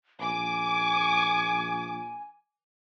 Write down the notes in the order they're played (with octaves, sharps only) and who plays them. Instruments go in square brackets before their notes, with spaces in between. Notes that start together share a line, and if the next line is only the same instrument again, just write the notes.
[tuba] A#1 [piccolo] G#5 [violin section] D6